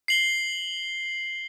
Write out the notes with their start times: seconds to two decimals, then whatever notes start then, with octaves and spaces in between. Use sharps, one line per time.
0.08 C7 F#7 G7